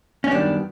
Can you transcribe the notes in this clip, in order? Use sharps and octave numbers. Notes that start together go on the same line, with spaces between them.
C#4
F#2 D#3 G3 B3 D4